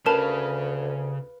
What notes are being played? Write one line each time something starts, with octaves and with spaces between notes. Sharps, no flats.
D2 C#3 A#4 B4 F5 A5